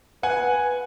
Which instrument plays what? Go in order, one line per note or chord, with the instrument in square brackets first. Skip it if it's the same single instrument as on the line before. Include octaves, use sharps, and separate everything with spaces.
[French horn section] B4 [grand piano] F#5 G#5